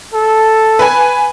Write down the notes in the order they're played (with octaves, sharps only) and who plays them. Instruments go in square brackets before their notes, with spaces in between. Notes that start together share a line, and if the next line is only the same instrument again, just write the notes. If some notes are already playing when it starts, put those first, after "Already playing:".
[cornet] A4
[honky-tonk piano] B4 G#5